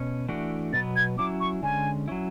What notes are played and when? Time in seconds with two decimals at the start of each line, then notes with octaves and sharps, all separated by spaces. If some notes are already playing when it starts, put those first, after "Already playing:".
Already playing: B2 C#4
0.28 E3 A3 D4 F#4
0.73 B2 F#3 B3 A6
0.96 G#6
1.18 F#3 C#4 E4 D6
1.40 C#6
1.63 D3 G#3 C#4 G#5
2.08 F#3 C#4 E4